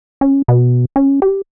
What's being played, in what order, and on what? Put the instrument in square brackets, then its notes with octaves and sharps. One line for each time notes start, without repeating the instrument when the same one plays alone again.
[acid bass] C#4
B2
C#4
G4